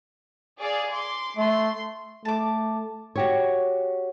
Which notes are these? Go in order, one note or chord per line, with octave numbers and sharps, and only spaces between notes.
G#4 D5 F5
C6 D6
A3 C6
A3 A5 D6
F#4 G4 C#5